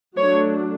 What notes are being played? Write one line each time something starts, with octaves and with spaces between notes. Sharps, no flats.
F#3 A3 D4 C#5